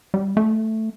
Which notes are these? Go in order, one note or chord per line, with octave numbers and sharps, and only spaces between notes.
G3
A3